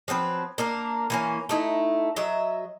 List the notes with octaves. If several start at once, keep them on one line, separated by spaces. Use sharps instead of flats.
F3 F#3 C4 B4
A#3 D4 A#4
E3 A#3 C#4
A3 D#4 E4
F#3 D#5 E5